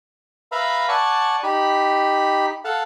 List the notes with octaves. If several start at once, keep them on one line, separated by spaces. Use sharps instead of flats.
B4 E5 F5 A#5 B5
D5 F#5 G#5 A5 C#6
D#4 G4 B5
A4 F5 F#5 A5